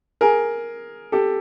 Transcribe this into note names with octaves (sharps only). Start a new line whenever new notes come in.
G#4 A#4
G4 A4